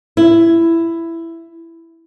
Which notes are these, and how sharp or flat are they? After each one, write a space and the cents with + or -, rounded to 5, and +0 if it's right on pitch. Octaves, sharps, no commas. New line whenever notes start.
E4 +10